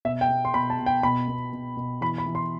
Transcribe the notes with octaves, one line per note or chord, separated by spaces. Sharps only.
B2 E5
G5
B2
C6
B2 B5
A5
B2
G5
B2 B5
B2
B2
B2
E3 B5
B5
E3
C6